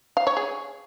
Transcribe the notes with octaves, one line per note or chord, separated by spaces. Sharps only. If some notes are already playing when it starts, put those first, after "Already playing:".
F5
C#5
G#4